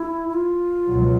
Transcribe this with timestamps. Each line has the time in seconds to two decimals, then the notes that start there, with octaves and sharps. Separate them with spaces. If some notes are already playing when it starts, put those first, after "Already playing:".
Already playing: E4
0.29 E4
0.34 F4
0.89 C#2 B2 F#3